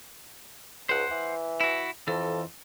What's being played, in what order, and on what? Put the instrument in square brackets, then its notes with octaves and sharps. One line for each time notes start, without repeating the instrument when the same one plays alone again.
[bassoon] C#2 [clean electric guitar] C5 F#5
[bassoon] E3
[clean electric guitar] E4 F#4
[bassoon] F2 [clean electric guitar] E3 A4